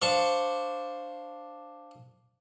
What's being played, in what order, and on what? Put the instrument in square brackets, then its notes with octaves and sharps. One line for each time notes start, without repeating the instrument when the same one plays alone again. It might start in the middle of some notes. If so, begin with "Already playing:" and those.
[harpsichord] D4 C5 F5 C#6